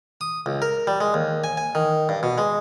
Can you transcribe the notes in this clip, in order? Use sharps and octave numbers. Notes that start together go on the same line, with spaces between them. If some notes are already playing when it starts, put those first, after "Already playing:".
D#6
C#2
A#4
G3
G#3
D#2
G#5
G#5
D#3
G2
B2
G#3